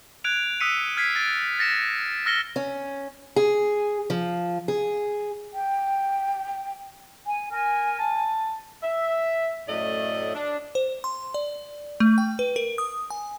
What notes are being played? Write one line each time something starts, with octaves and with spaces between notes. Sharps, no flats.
F#6 G#6 D7 F7
D#6 E6 F#6 B6 C#7 D#7
F6 G#6 B6 C7
A6 D7
A6 A#6 C#7 E7
E6 F6 A#6 C#7 G7
C#4
G#4
F3
G#4
G5
G#5
A#4 G#5
A5
E5
F#2 A2 A3 D5 D#5
D4
C5
C6
D5
A3
G5
B4
A#4
D#6
G#5